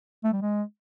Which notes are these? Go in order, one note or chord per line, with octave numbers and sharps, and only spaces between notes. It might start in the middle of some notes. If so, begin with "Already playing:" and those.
A3
G3
G#3